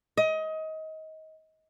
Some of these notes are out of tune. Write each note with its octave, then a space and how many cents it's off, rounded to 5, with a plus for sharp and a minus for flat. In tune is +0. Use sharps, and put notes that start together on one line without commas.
D#5 +25